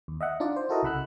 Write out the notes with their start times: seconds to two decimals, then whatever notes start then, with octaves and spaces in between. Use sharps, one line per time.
0.08 D#2
0.21 D#5 E5 F#5
0.40 D4 D#4 F4 D5
0.56 C5
0.69 E4 F#4 A4 A#4 D#5
0.83 C2 C#3 F#5 B5 E6 F#6